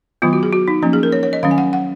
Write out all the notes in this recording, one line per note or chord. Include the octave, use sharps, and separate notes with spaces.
D#3 F#3 B3 F4
F#4
G#4
F#4
D#4
F3 A#3 C#4
G#4
A#4
C#5
C#5
D#5
D#3 F#3 C#4 F5
G#5
F#5
F#5